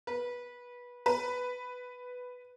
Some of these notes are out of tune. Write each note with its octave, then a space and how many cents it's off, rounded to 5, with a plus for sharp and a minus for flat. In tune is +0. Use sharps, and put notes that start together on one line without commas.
B4 -20
B4 +5